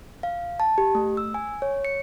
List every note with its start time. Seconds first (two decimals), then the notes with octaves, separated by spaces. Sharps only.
0.23 F5
0.60 A5
0.78 G4
0.95 A3
1.17 E6
1.34 G#5
1.62 C#5
1.85 C#7